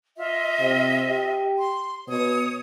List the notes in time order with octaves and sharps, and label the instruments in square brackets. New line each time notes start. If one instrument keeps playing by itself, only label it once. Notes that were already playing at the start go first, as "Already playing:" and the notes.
[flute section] F4 D#5 E5
[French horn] C3
G4
[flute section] C6
[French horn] B2 [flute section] C#5 D#6